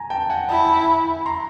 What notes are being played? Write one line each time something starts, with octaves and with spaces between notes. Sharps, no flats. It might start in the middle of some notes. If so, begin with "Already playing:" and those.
Already playing: G#5 A#5
G5 A5
F#5 G#5
E4 G5 A5
A#5 C6